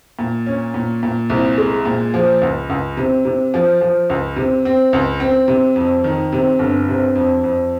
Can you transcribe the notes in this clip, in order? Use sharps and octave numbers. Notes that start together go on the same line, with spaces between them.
A#2
C#4
A#2
A#2
C2
G#3
A#2
F3
C#2
C#2
C3
C3
F3
F3
C#2
C3
C4
C#2
C4
C3
F2
D#3
C3
G1
C3
F2
F2